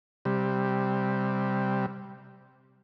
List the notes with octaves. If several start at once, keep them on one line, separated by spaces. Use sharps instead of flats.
C3 G3